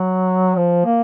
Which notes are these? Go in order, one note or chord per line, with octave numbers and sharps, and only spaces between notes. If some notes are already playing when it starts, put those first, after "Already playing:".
Already playing: F#3
F3
A#3